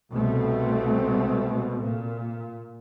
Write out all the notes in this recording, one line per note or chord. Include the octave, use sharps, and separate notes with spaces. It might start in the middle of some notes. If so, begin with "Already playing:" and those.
C2 B2 A3 C4
A#2